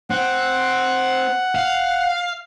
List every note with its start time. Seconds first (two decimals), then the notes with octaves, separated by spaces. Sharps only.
0.10 C4 F#5
1.55 F5